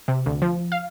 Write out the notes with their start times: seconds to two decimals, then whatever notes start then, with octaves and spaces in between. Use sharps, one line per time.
0.08 C3
0.26 D2
0.42 F3
0.72 F5